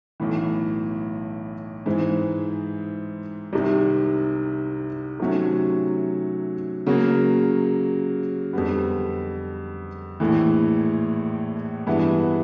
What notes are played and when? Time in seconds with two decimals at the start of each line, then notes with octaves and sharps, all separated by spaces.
0.20 B1 A2 E3
1.86 G#2 E3 G#3 C4
3.53 C2 C3 D#3
5.19 C3 D#3 F#3 A3 C#4
6.87 C#3 F#3 A#3
8.53 F2 D3 G3 B3
10.20 A#1 A2 E3
11.87 G2 E3 G#3 B3 E4